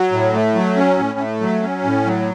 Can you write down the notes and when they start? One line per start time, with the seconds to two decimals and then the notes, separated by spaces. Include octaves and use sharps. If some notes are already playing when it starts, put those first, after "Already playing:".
Already playing: F#3
0.12 A2
0.34 A3
0.55 F#3
0.76 C#4
0.98 A2
1.19 A3
1.41 F#3
1.62 C#4
1.84 A2
2.05 F#3